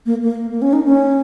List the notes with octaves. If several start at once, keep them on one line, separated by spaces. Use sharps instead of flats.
A#3
A#3
A#3
C#4
D#4
C#4